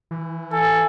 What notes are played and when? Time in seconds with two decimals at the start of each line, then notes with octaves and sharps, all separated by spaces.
0.11 E3
0.52 A4 G#5